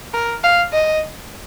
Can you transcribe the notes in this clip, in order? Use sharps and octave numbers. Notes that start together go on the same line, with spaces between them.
A#4
F5
D#5